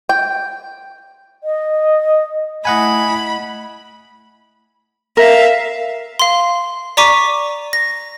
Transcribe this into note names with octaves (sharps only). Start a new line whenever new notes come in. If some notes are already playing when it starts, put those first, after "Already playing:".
G5
D#5
A3 E4 D#5 F#5 G#5 B5
A#4 E5 F5
F5 C6
D5 A#5 C#6 D6 B6 D#7
A#6